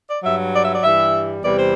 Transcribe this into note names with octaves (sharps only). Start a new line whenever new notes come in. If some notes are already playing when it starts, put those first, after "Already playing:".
D5
G2 F#3 E5
D5
E5
D5
G2 E3 G3 E5
E2 C3 E3 G3 D5
C5